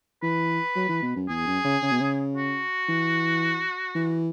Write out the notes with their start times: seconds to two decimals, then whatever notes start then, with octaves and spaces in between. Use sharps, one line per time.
0.22 E3 B4
0.76 F#3
0.89 E3
1.03 B2
1.16 F#2
1.29 E2 G#4
1.47 F#2
1.64 C#3
1.82 C#3
1.92 B2
2.01 C#3
2.35 F#4
2.89 E3
3.95 E3